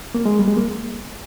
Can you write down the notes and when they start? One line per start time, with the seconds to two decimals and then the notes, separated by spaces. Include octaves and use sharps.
0.15 A#3
0.26 G#3
0.39 G3
0.48 G#3
0.57 A#3